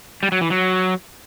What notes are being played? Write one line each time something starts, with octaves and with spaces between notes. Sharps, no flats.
G3
F#3
E3
F#3